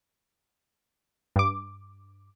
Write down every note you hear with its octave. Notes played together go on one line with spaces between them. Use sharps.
G2 D6